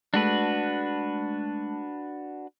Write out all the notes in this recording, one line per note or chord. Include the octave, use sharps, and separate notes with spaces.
G#3 A3 D4 F#4 B4 A5